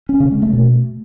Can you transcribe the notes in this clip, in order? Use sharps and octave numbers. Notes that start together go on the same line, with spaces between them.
C#4
C#3
G#3
A3
B2